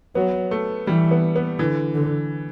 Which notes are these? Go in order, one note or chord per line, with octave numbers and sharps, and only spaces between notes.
F#3 B3
A3
E3 G3
B3
B3
D3 E3
D3